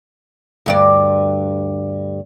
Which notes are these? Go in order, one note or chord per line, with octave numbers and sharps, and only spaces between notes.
D2 G2 D5